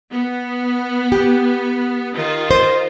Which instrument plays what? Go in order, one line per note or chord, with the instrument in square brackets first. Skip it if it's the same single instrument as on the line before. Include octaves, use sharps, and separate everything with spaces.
[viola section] B3
[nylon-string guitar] G4
[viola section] D#3 F4
[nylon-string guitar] C5